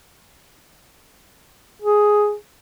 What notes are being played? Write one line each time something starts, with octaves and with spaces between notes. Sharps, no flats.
G#4